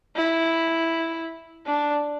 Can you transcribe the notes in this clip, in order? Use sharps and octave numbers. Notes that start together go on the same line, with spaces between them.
E4
D4